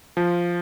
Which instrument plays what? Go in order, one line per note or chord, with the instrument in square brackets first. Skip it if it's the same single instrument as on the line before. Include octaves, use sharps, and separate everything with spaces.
[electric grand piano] F3